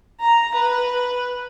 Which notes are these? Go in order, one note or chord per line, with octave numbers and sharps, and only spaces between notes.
A#5
B4